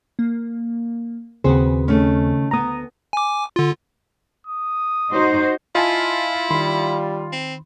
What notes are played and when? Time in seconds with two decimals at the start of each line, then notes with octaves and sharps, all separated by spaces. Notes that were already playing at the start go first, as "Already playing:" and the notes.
0.19 A#3
1.44 D#2 C#3 C4 F#4 G#4 B4 C5
1.88 D#3 A3 C#4
2.51 D2 B3 A#5 D#6
3.13 G#5 D6
3.56 D3 F4
4.47 D#6
5.10 D#4 F#4 C5
5.75 E4 F4 D#5 G#5 A5
6.51 D#3 G3 B5 C6
7.32 C4